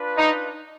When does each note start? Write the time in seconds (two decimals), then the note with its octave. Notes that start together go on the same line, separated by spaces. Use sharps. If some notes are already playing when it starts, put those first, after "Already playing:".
Already playing: D4 F4 B4
0.17 D#4